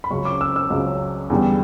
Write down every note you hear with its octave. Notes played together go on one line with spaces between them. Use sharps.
B5
C#2 C#3 F#3 C#6
D6
E6
E6
C#2 C#3 F#3
E2 D3 G3